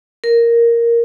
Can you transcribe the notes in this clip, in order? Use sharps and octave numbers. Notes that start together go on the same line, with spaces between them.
A#4